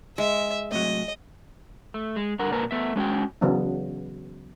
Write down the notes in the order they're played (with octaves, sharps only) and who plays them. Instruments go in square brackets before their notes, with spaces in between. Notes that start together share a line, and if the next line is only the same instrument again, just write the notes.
[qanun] G#3 [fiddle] E5
[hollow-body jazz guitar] A2 C3 F#3 [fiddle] D#5
[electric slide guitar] A3
G#3
G2 D3 A#4 F#5
A#2 A#3 A#4 B4 A5
A3 B3 E5
G#3 C#4 F#4 G5
[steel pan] C#3 E3 F#3 B3 D4